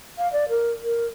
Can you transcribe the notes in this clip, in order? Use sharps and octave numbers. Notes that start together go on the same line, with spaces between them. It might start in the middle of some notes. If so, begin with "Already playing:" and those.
F5
D5
A#4
A#4